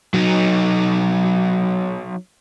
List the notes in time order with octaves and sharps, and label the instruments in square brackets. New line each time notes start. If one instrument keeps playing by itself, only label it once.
[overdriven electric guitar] F#3 D#4